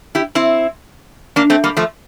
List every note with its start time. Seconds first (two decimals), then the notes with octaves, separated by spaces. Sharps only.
0.15 E4 G4
0.35 C4 E4
1.36 A#3 D4
1.50 A3 C4
1.64 G3 A#3
1.77 F3 A3